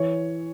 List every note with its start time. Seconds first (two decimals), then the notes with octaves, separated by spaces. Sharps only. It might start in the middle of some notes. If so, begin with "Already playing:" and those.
Already playing: E3 C#5